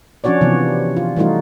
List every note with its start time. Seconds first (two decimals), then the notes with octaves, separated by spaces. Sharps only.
0.24 F3 C#4 D4 F#4 C#5 D5
0.41 C3 E3 F3 B3
0.97 F4
1.17 E3 G3 A3 D#4 F4 F#4